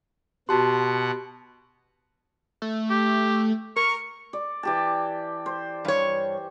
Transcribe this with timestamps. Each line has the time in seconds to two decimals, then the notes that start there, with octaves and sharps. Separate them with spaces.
0.49 B2 F#4 G4 F#5 A5 C6
2.62 A3
2.90 G4
3.76 A#4 C#6
4.33 D5
4.63 E3 G4 A5
5.46 C5
5.85 G2 C#5